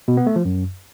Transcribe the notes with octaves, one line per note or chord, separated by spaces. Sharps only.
B2
B3
A3
F3
F#2